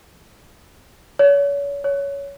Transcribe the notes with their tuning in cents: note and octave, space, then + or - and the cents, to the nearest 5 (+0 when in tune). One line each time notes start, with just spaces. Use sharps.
C#5 +35
C#5 +15